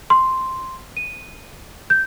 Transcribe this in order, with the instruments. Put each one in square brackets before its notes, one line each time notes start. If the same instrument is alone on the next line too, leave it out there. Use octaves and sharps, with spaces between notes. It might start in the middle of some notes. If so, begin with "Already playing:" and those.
[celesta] C6
D#7
G6